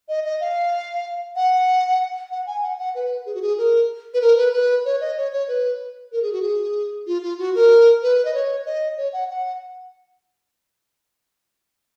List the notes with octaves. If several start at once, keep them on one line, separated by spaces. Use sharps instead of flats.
D#5
D#5
F5
F#5
F#5
G#5
F#5
F#5
B4
G#4
F#4
G#4
A#4
B4
A#4
B4
B4
C#5
D#5
C#5
C#5
B4
A#4
G#4
F#4
G#4
F4
F4
F#4
A#4
B4
D#5
C#5
D#5
C#5
F#5
F#5